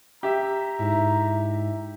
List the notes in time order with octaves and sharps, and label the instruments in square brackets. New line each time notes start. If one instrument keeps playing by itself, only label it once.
[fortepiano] G4 E5 [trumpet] A#5
[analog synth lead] G#2 [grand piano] E4